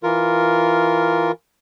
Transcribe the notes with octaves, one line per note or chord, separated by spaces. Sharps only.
E3 F4 A#4